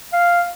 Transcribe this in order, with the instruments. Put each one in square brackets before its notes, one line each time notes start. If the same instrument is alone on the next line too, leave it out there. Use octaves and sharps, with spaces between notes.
[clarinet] F5